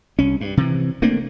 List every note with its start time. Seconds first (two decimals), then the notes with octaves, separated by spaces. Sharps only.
0.19 C2 C#4
0.41 G2
0.57 C3 E3
1.02 A3 A#3 C4 D4